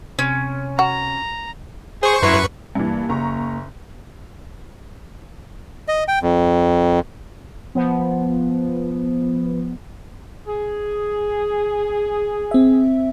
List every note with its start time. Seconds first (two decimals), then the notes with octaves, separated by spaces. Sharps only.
0.19 C3 C#4
0.79 F#4 A#5
2.03 G#4 C5 C#6
2.23 F#2 E4 B4 A#5 C6 C#6
2.75 G2 E3 A#3
3.09 F#1 A#5 C#6
5.88 D#5
6.08 G5
6.22 F2
7.75 F3 B3
10.47 G#4
12.51 C4 E5